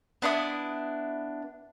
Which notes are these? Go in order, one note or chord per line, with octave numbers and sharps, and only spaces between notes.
B3 D4 E4 D#6